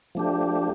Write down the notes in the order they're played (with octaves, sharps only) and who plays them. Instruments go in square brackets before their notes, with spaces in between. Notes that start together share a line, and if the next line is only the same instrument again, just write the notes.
[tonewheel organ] F3 A3 D4 G4